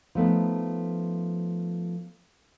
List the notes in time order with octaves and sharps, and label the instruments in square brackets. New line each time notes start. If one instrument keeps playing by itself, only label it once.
[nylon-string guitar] F3 A3 B3 D#4